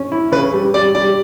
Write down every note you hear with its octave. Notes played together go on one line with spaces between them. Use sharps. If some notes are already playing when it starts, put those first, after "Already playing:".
Already playing: C#4
E4
C#3 B4
G3
G3 D5
G3 D5